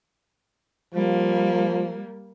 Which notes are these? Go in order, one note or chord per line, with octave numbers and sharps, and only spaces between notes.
F3 G3 A#3